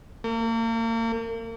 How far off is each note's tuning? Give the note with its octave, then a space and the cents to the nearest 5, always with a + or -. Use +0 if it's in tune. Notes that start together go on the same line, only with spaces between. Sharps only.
A#3 -40